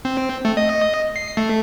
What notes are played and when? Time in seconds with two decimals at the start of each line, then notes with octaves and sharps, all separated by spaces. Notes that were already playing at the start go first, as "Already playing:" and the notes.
0.05 C4
0.45 A3
0.57 D#5
1.16 C7
1.37 A3